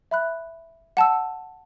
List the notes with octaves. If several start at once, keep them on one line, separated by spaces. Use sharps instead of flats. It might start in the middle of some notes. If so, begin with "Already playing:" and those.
E5 B5 F#6
F#5 A5 E6